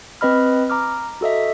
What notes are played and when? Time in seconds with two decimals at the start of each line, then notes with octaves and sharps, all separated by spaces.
0.21 C4 B4 D#5 B5 F6
0.69 A#5 D6 F6
1.21 F#4 A4 D#5 E5